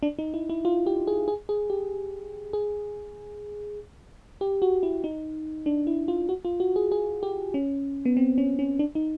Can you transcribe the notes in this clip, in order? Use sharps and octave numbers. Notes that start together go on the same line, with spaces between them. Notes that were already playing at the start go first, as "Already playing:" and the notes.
D4
D#4
E4
E4
F4
G4
G#4
G#4
G#4
G4
G#4
G4
F#4
E4
D#4
D4
E4
F4
F#4
F4
F#4
G#4
G#4
G4
C#4
B3
C4
C#4
C#4
D4
D#4